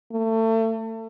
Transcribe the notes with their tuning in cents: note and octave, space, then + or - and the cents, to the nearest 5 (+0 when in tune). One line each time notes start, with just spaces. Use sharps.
A3 +30